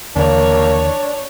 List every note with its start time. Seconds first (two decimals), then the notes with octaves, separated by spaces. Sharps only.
0.16 D#2 D3 E3 A#3 D4 C#5